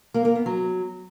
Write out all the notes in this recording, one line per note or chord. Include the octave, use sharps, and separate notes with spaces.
A#3
A#3
B3
F#3